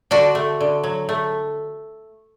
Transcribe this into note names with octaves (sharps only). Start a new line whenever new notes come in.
D3 D4 F#4
A3
D3
F#3
A3